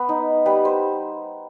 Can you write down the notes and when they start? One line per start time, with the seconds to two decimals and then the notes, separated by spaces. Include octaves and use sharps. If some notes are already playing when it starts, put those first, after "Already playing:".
Already playing: B3 B4
0.09 D#4
0.46 G3 B4
0.65 C5